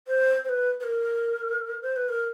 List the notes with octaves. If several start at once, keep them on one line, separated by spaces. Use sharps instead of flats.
C5
C5
B4
B4
A#4
C5
B4
A#4